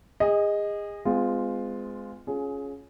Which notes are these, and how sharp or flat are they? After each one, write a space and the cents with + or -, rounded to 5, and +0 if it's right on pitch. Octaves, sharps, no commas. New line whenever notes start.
G#4 -30 D#5 +0
G#3 +0 C4 -45 F4 +0
C#4 +0 F4 +20 G#4 +20